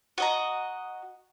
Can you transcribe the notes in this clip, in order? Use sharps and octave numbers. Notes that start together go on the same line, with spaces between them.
F#4 D#5 A#5